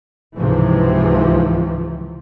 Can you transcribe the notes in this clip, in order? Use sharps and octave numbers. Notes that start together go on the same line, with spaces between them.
C#2 G#2 C3 E3 F3